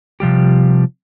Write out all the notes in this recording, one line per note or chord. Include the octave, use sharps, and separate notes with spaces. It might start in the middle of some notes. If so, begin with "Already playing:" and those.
C3 F3 G3 G4